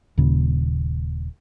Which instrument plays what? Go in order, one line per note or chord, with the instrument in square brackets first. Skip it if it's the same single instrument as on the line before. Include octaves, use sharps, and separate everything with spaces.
[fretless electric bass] D#1 D#2 A#2 C#3